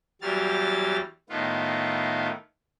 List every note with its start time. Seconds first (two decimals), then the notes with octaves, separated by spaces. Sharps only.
0.21 E2 F#3 G3 F6 A6
1.29 A2 D#3 B3 F4